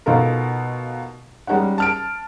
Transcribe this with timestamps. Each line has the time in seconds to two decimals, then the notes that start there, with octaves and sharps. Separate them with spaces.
0.06 B2 D#4 F4 A4 A#4
1.47 G3 G#3 C#4 D#4 F#5
1.78 A5 F6 D7